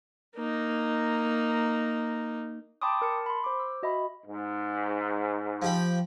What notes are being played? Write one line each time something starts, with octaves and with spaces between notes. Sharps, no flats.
A#3 D#4
G5 A5 B5 C6 D6 D#6
A#4 A5 C#7
B5 C6
C5 D6
E6
F#4 D#5 E5 B5
G#2
F3 G4 B5